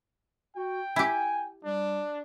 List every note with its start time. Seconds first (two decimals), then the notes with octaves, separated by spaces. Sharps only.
0.56 F#4 G5
0.96 E4 G4 G#5
1.64 G3 D4